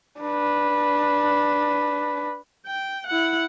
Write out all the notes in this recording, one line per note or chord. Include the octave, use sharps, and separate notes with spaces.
D4 B4
G5
E4 F#5